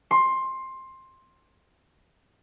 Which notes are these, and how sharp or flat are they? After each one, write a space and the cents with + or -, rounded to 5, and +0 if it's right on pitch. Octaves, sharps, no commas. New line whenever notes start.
C6 +15